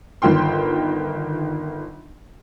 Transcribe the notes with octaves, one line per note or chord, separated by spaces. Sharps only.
G1 D#3 F4 G5 C6